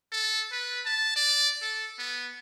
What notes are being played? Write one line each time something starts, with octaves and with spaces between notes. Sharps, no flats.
A4
B4
A5
D5
A4
B3